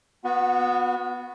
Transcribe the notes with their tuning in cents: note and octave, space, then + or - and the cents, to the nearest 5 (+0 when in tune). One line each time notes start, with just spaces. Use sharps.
B3 +0 F#4 -35